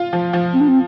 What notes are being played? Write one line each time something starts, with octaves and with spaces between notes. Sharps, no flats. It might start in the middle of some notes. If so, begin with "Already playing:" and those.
Already playing: F4
F3
F3
C4
D4
C4